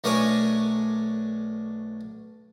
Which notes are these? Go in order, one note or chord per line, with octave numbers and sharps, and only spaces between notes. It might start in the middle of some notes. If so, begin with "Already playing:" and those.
B1 A3 D4 A#4 C#5 G#5